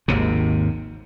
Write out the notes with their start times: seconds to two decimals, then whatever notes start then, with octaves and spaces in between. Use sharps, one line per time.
0.08 G#1 D#2 C3